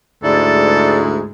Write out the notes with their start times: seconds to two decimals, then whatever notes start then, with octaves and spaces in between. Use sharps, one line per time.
0.23 D2 G#2 G#3 E4 A4 D5